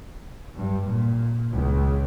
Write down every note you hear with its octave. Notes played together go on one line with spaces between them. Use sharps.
G2
A#2
C#2